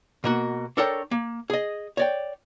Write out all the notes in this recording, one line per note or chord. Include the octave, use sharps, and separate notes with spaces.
B2 A#3 F#4
D4 A4 A#4 C#5 G5
A#3
G#4 D#5
C#5 D5 G5